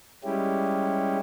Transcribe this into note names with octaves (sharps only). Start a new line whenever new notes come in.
G3 G#3 C#4 E4 G4